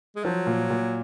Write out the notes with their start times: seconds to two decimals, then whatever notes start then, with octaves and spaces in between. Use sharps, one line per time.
0.16 G#3
0.24 F3 F#3
0.47 A#2
0.70 A#2